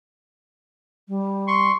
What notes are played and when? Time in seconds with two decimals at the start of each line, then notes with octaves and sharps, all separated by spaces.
1.08 G3
1.47 C6 C#6